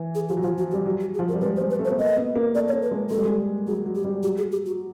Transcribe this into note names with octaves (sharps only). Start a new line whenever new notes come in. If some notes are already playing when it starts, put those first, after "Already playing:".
Already playing: E3
G#4
F3 G4
F#3
F3 F4
F#4
G4
G3
F#3
G4
G#4
F3
F#3 A#4
G3
G#3 B4
C5
G#3
B4
A3
C5
B3
A#3 D#5
B3
A#3
A3 D5
C#5
A3
B4
G#3
G#3 A4
G3
G#3
F#3 G#4
F#3
G4
G3
F#3 G4
G#4
G4
F#4